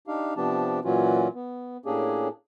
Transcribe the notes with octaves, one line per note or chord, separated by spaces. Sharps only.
D4 D#4 G4 F5
C3 F3 B3 D4 G4 A5
A#2 E3 F#3 C#4 F4 F#4
B3
A2 A#3 C#4 D4 G4 G#4